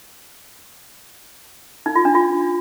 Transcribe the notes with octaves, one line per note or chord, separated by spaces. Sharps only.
D#4
F4
D4
F4